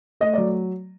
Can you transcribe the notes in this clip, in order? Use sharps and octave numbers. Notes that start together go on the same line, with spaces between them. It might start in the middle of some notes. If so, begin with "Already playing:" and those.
A3 D#5
F#3 D5